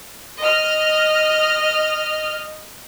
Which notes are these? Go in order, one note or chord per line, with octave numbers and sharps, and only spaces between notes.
D#5 F6